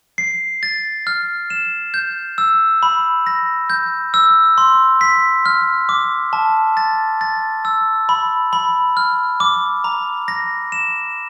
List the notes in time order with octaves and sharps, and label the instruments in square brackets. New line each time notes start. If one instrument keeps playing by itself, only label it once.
[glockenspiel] C7
A6
F6
E7
G6
E6
B5
A#6
G6
E6
C6
B6
F6
D6
A5
A6
A6
E6
B5
B5
F6
D6
A#5
A#6
E7